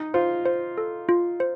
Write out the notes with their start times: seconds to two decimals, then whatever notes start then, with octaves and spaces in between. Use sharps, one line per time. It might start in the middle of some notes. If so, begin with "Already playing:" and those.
Already playing: D#4
0.14 F4 C5
0.46 C5
0.78 A4
1.09 F4
1.40 C5